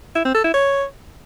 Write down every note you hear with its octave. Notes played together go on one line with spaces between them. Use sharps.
E4
C4
A4
E4
C#5